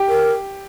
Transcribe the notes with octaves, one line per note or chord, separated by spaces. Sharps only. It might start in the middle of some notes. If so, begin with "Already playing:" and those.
Already playing: G4
A#4